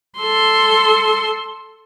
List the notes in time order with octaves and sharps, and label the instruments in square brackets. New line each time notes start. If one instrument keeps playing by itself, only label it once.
[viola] A4 C6